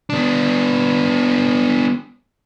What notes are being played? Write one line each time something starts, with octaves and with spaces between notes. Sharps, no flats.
B3 D4